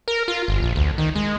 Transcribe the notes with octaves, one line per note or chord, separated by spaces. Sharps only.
A#4
F4
G1
A#1
D2
D#3
G#3